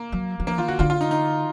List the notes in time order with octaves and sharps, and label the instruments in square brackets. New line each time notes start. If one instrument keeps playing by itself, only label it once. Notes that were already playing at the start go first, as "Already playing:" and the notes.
Already playing: [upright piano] A#3
[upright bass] F#3
F#3
[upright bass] F3 [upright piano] A#3
[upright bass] D#3 [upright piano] F4
[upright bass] D3 [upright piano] F#4
[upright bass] D3 [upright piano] F4
[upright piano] F4
D#4
D#4